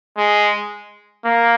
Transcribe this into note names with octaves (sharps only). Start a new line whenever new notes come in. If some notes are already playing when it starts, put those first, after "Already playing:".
G#3
A#3